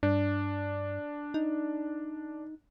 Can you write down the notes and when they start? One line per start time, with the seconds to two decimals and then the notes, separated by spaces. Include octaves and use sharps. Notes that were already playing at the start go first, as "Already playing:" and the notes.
0.03 G2 D4
1.34 D#4